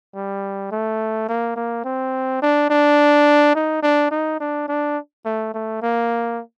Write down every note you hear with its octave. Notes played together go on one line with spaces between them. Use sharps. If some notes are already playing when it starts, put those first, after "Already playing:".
G3
A3
A#3
A#3
C4
D4
D4
D#4
D4
D#4
D4
D4
A3
A3
A#3